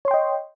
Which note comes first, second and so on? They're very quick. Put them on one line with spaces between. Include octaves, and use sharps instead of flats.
C#5 C6 G5 D#5